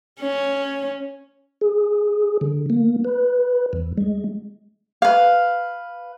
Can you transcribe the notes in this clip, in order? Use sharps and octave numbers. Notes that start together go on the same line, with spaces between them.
C#4
G#4
D3
A#3
B4
E2
G#3
B4 F5